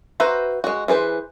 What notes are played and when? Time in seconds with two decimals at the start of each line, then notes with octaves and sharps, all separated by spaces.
0.20 F#4 B4 C5 E5 A#5
0.64 G#3 F#4
0.88 E3 G#4 B4 C5